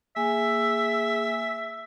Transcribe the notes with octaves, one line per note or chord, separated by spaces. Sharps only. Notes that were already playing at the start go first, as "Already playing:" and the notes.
A#3 G#4 E5 G#5